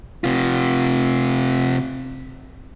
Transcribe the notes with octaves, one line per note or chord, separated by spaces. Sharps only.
C3 F4